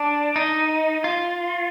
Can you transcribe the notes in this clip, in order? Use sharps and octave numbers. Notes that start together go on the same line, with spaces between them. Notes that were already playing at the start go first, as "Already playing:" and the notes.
Already playing: D4
D#4
F4